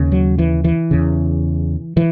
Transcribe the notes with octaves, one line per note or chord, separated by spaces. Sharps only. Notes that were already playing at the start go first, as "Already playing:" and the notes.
Already playing: D#2 C#3
F#3
E3
E3
E2 C#3
E3